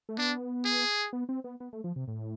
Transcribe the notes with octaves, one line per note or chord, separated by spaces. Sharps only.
A3
B3 D4
G#4
B3
C4
B3
B3
A3
F3
C3
A2